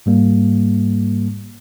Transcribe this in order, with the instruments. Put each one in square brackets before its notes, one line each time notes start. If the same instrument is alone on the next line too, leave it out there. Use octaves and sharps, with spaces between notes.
[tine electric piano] G#2 G3 A#3